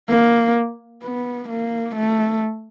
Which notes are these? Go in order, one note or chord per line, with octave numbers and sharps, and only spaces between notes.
A#3
B3
A#3
A3